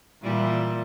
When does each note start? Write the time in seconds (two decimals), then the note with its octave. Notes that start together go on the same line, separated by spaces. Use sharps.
0.22 A#2 E3 G3